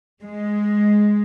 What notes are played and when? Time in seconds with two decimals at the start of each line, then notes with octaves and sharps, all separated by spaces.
0.22 G#3